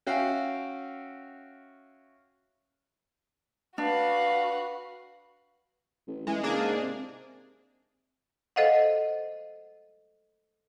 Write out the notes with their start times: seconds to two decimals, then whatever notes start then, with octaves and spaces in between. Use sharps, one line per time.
0.07 C#4 F#4 E5 F5 G5
3.78 D4 F#4 B4 F5
6.07 A1
6.27 E3 G#3
6.43 C#3 A#3 D4 G#4
6.60 G#2
6.81 C3
8.56 A4 C5 D#5 F5 F#5